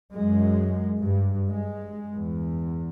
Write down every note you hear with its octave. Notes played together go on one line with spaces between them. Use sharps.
F#2 G#3
G2
G#3
E2